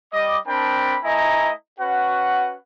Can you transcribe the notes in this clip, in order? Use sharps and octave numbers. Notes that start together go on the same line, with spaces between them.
G3 D#5 D6
C4 D4 A#4 G5 A5 B5
A3 E4 D#5 G#5 A#5
C#4 F#4 B4 F#5